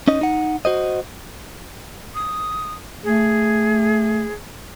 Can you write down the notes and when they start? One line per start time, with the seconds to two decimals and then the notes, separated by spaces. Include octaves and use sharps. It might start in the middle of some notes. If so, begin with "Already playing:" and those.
0.08 C#4 D#4 D#5
0.21 D#4 F#5
0.65 F#4 C5 D#5
2.15 D#6
3.04 A3 G#4